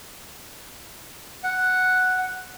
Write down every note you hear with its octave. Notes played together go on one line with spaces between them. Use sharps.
F#5